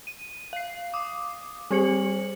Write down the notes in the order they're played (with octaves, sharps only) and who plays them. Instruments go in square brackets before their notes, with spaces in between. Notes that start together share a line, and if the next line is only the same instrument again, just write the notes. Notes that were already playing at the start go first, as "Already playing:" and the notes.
[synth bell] D#7
F5 C7
D6 D#6
G3 C4 G4 C5 C#7 F#7